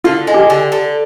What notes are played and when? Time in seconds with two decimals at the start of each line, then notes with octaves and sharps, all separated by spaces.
0.04 D3 F4
0.27 G#3
0.34 G4
0.50 D3
0.72 D3